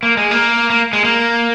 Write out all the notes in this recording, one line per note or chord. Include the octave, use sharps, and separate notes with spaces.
A#3
G#3
A#3
A#3
G#3
A#3